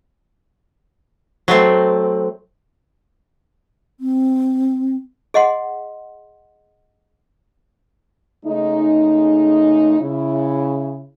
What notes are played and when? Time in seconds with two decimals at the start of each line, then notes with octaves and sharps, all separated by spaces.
1.48 F#3 A3 C4
4.00 C4
5.34 G#4 D#5 F#5 C6
8.44 C#3 G#3 A3 D#4
9.99 C#3 E4